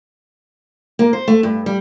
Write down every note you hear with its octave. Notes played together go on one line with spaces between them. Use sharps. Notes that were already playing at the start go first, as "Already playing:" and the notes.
A#3
C5
A3
G2
G3